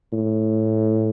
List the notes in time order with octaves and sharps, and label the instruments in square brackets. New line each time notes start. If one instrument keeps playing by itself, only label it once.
[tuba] A2